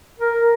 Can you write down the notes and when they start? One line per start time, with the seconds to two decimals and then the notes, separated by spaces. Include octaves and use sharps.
0.20 A#4